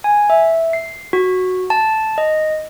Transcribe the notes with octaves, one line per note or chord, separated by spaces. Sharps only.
G#5
E5
C7
F#4
A5
D#5